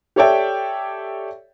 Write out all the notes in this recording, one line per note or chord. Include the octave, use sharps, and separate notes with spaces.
G4 A4 C#5 D5 E5 G5